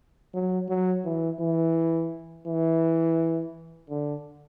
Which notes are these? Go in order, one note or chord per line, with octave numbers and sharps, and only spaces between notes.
F#3
F#3
E3
E3
E3
D3